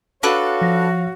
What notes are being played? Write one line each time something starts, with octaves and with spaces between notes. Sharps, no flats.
D4 F#4 A4 B4 C#5 F5
F3 A#6